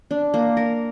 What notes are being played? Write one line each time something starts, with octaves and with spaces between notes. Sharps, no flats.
D4
A#3
A#4